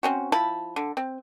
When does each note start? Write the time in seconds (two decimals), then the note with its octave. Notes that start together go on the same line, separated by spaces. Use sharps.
0.03 C4 C#4 F#4
0.32 F3 E4 A5 B5
0.76 D3
0.97 C4